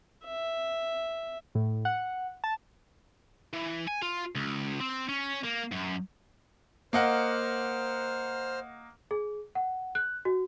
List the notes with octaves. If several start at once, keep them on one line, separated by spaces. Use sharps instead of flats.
E5
A2
F#5
A5
E3
G#5
F4
C#2
C4
C#4
A#3
F#2
A#3 C5 D#5 F#5 F6
G#4
F#5
F#6
F#4